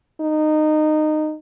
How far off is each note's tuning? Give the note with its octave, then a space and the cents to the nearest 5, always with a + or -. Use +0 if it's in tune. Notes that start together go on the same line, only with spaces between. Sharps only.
D#4 -20